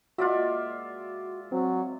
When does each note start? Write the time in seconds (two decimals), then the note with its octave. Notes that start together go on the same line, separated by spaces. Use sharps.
0.18 A#2 G#3 F4 F#4 D5 E5
1.52 F#3 C4